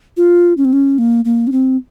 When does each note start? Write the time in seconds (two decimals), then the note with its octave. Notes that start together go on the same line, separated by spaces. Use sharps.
0.17 F4
0.57 C#4
0.65 C4
0.73 C#4
0.98 A#3
1.25 A#3
1.47 C#4
1.52 C4